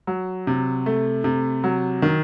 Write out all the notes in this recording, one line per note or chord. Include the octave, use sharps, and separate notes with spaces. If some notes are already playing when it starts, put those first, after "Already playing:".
F#3
C3
A3
C3
F#3
D#3